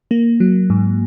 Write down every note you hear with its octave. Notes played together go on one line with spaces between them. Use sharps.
A#3
F#3
G#2